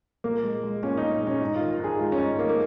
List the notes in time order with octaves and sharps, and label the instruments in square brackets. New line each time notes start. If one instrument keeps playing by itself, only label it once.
[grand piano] A#2 A#3
G#3
G#3
A#2 C#4
D#4
A#2
G#3
C#4
G#2 D#4
F4
D#3
G#2 G#4
G#3 F4
C#4
G#2 D#4
D#3 A#3
A#3